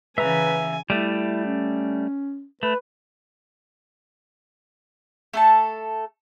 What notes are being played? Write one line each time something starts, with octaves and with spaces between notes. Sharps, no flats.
C#3 E3 B4 E5 G#5 A#5
G3 A3 E4
C#4
A3 B4
A3 A4 A5